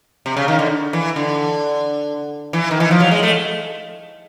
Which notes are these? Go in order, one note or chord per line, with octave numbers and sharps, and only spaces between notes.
C3
C#3
D#3
D3
E3
D3
E3
D#3
E3
F3
F#3
G#3
A3